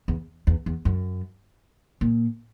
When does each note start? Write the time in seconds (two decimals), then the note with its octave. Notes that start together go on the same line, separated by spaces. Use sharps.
0.08 E2
0.47 E2
0.66 E2
0.85 F#2
2.01 A#2